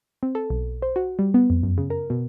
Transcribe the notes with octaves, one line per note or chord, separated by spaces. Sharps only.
C4
A4
B1
C5
F#4
G3
B3
F2
F#2
C#3
A#4
B2